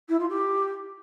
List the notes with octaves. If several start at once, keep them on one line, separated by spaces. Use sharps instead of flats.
E4
F4
G4